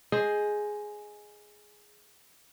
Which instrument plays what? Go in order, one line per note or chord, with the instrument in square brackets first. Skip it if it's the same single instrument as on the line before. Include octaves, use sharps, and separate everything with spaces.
[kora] G#4 C5 D#5